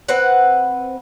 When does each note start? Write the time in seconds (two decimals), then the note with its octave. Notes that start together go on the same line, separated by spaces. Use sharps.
0.08 C4 B4 F#5